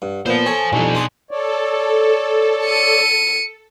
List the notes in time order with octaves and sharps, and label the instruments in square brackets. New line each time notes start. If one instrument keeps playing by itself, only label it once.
[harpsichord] G2 [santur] F#5
[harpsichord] A#2 B3 [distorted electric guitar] C5 F5
[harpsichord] A4 C#5 [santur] G#5
[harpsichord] C2 F2 [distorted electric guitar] B2 D#4 [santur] D4 G#5 C#6
[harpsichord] G#4 D6 D#6 [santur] C6
[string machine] A4 [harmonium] C#5 D5
[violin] C#7 D#7